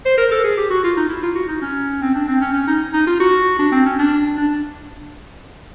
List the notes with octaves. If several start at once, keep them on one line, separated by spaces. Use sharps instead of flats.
C5
A#4
A4
G#4
G4
F#4
F4
D#4
E4
F4
F#4
D#4
C#4
C4
D4
C4
C#4
C#4
D#4
D#4
F4
F#4
D4
C4
C#4
D4
D4